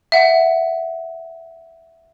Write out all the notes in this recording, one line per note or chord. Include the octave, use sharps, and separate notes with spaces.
E5 F#5